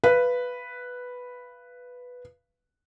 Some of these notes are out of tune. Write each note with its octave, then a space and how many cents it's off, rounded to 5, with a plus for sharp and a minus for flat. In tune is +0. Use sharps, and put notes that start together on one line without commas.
B4 +0 F5 -25